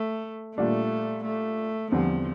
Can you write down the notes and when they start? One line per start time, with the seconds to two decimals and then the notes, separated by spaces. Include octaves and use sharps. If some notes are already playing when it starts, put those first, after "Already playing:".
Already playing: A3
0.57 A#2 G3 A3 D4
1.25 A3
1.92 E2 D3 F3 G3 C4